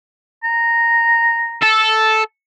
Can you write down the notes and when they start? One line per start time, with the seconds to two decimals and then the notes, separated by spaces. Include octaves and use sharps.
0.44 A#5
1.63 A4